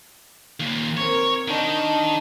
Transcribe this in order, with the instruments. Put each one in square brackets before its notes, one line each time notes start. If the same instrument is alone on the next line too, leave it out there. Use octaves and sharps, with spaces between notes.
[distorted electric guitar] D#2 A#2
[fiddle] C4 A#4 [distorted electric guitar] C#5
[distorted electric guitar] D#3 [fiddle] D4 D#5